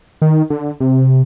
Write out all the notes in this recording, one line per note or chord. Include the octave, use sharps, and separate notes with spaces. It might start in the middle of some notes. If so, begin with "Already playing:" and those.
D#3
D3
C3